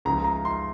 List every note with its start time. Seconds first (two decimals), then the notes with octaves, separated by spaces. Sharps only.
0.05 C#2 C#3 F3 A#5
0.24 A#5
0.45 C6